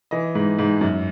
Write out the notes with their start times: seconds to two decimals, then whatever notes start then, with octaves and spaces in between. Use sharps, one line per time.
0.11 E3 D#5
0.35 G#2
0.59 G#2
0.81 F#2